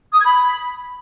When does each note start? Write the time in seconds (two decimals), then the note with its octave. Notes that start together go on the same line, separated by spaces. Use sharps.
0.13 D#6
0.19 G#6
0.26 B5